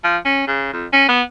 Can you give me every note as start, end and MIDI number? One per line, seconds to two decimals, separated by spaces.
0.04 0.17 53
0.25 0.43 61
0.47 0.69 49
0.73 0.86 41
0.93 1.06 61
1.09 1.22 59